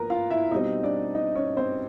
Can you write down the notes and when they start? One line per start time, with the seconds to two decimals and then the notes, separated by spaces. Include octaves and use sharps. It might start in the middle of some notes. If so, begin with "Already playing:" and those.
Already playing: F3 A#3 A#4 B4 A#5
0.10 F4 F5
0.30 E4 E5
0.51 B2 G3 C4 D#4 D#5
0.83 D4 D5
1.15 D#4 D#5
1.35 C#4 C#5
1.57 C4 C5